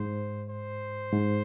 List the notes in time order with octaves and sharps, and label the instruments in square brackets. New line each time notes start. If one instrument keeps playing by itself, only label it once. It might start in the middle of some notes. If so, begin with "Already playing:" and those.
Already playing: [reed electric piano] G#2 [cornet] C5
[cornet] C5
[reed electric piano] G#2